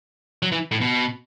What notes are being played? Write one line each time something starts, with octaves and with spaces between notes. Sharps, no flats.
F#3
E3
A2
B2